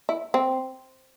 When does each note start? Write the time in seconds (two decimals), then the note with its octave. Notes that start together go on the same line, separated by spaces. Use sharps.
0.09 E4
0.34 C4